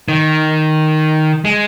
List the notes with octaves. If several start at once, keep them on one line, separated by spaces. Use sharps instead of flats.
D#3
G#3